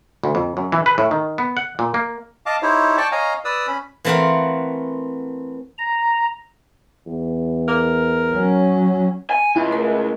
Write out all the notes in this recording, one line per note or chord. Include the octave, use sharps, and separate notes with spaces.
D2
F2
F#2
E3
B4
A2
D#3
B3
F#5
A#2
A#3
D#5 F5 A5 D6
D#4 E4 G4 C5 C#5
D5 G5 A5 C#6 D6
C#5 D#5 F5 G#5 A#5
B4 D5 D#6 E6
C#4 B5
E3 A3 C4 A#4 F5 F#5
A#5
E2
A#4
F#3 C#4
G#5
C#2 E4
A3 A#4